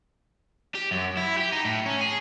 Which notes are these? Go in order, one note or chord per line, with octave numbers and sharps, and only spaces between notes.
G4
F#2
E4
G4
D#4
A2
C#4
G#4